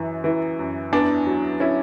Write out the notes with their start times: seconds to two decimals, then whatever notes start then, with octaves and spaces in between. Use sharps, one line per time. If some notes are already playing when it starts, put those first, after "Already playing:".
Already playing: F#2 E3
0.24 E3
0.59 F#2
0.92 E2 B3 D4
1.27 F#3
1.60 C#4 E4